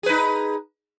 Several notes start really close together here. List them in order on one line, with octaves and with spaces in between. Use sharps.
G#4 B4 D#4